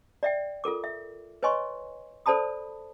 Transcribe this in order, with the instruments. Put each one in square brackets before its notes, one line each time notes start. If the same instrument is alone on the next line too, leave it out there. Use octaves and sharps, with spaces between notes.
[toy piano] D5 E5 G5
F4 A4 A#4 D6
E5
B4 C#5 D#5 G#5 C6 C#6
A4 C5 D5 A5 B5 D#6